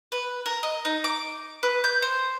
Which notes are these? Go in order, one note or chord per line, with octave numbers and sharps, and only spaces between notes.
B4
A#4
D#5
D#4
D6
B4
G6
C5